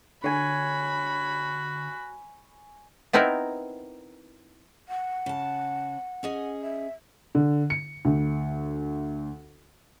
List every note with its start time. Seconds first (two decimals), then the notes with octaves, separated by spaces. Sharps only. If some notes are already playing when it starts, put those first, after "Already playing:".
0.24 D3 F#4 C#5 G#5 B5
3.13 B3 C4 D#4 E4 A#4
4.89 F#5
5.26 C#3 A5
6.23 C#4 G#4 D#5
6.62 E5
7.35 D3
7.70 C#7
8.05 D2